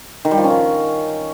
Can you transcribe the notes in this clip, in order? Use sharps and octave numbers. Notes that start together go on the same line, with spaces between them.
D#3
G3
F3
C#4
D#3